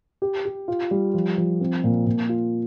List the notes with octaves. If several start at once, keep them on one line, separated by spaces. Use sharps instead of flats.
G4
G4
F4
G3
F3
F3
C4
A#2
A#2
F4